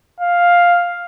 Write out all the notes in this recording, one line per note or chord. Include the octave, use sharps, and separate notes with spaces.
F5